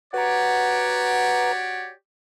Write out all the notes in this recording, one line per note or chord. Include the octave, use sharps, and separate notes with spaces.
F#4 G4 B4 C#5 D5 F#5 A#5